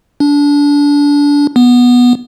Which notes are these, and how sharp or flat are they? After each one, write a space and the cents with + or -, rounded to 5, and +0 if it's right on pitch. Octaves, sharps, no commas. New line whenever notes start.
D4 -25
B3 -10